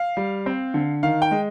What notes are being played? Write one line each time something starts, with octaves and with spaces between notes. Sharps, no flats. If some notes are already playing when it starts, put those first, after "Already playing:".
Already playing: F5
G3
C4
D3
D#3 F5
G5
G#3